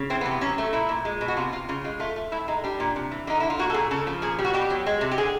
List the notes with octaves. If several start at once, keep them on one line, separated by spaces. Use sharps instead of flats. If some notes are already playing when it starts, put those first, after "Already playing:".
Already playing: C#3
E3 C4
B3
C3
B3
F#3 C#4
A3
A#2 E4
A#2
G#3
B2
F#4
C3 F4
C3 F4
C#3 F4
G#3 F4
A3 F4
A3
A2 E4
G#3 D#4
G3 D4
A#2
C3
E3
D3 D#4
D3 E4
F4
A#2 F#4
A4
A#2 G#4
C#3 A4
F3
A#2 G#4
G3
F#4
B2 G4
F#3
G#3
C3
G4
D3 G#4